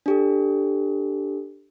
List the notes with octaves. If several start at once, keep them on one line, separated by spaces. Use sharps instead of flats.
D4 G4 A4